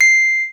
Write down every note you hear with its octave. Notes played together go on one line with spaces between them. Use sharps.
C7